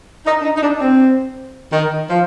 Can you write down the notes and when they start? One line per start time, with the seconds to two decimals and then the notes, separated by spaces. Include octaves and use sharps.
0.26 D#4
0.41 D4
0.44 D#4
0.57 D#4
0.63 D4
0.81 C4
1.73 D#3
2.10 F3